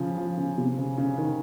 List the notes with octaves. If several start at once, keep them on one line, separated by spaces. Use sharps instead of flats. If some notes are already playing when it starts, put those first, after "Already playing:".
Already playing: C#3 F3
F3
C#3
C3
C#3
C#3
D#3